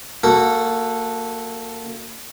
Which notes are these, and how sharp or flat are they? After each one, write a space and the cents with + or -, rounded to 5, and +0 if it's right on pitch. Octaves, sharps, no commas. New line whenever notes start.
A#3 -25 F#4 +0 A4 +0